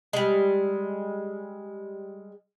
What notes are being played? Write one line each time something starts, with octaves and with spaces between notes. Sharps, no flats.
G3 G#3